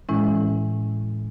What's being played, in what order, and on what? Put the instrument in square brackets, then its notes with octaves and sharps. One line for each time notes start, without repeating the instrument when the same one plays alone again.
[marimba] A2 E3 G#3 C#4 E4